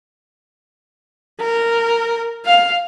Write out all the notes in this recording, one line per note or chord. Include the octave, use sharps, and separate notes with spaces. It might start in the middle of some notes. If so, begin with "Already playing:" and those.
A#4
F5